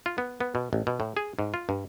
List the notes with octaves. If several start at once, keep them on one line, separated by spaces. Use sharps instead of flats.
F4
B3
B3
B2
A1
B2
A2
G#4
G#2
F4
G2